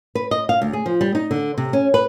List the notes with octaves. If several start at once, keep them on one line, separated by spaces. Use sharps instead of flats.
B4
D#5
F5
D2
G#4
F3
G3
D#4
D3
C3
C#4
B4